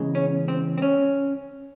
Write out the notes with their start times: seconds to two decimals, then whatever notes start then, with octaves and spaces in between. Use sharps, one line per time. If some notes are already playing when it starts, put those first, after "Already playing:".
Already playing: E2 C#3 G#3
0.15 C#4
0.48 C4
0.78 C4
0.82 C#4